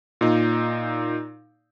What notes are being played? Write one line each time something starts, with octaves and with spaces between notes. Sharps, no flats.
A#2 D#4